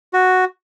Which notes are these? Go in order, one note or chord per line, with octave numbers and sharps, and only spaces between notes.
F#4